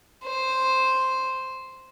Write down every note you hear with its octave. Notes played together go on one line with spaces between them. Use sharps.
C5